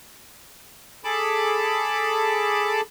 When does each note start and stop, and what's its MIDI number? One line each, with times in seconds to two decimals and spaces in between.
1.04 2.81 68
1.04 2.81 69
1.04 2.81 81
1.04 2.81 83
1.04 2.81 86